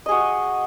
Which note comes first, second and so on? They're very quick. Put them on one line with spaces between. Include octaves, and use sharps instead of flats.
D#5 G#4 F#4